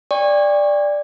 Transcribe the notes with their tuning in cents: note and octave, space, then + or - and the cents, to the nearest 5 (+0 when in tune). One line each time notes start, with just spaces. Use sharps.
D5 +0 G5 +35 C#6 -20